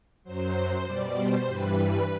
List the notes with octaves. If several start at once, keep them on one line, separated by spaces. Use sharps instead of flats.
F#2 F#3 C5
B2 G3 D5
C5
G2 E3 G3 B4
B4